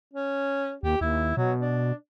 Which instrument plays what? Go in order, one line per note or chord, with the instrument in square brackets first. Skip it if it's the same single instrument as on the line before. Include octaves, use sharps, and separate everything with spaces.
[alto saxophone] C#4
[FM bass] D#2 [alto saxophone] G4
[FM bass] D#2 [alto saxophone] E4
[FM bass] B2 [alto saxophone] F#3
[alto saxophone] D4